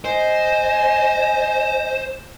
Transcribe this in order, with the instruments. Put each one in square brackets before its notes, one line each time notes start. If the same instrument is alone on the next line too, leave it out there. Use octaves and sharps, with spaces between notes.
[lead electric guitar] C5 [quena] D#5 [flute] G#5